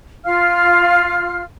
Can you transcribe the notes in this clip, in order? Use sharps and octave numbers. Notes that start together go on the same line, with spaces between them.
F4 F5 F6